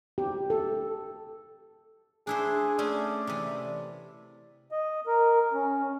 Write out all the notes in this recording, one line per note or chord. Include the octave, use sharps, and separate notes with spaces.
G4
A4
D4 E4 G#4 C5
A3 C#4 G#4 D5
C3 E3
D#5
A#4
C#4